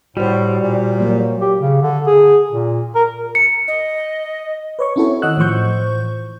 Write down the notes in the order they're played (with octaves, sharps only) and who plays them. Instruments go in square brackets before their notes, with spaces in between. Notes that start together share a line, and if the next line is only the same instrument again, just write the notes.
[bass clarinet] A2 [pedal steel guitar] G3 [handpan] F#4 C5
[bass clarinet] A#2
[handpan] F#3 A#3
[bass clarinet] G4
C#3
D3
G#4
A#2
A#4
[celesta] C#7
[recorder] D#5
[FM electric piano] B4 C#5 C#6
C4 C#4 E4 F#4 A4 C#5
D#3 D#5 F#5 E6 F#6
A2 E3 F3 C5 C#6 G6